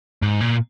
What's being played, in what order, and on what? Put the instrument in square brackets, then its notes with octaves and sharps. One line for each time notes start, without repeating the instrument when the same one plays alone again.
[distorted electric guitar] G#2
A#2